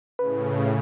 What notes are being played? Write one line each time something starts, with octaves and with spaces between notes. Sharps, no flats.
A2 C#3 B4